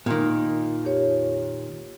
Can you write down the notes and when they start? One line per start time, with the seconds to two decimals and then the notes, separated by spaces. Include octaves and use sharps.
0.06 A#2 D#3
0.84 F2 G4 C#5